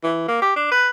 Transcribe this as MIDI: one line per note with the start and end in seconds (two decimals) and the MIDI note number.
0.03 0.28 52
0.28 0.38 58
0.42 0.52 67
0.56 0.68 62
0.71 0.89 71